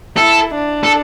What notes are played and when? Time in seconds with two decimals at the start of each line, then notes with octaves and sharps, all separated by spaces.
0.17 E4 A4
0.55 D4
0.84 A4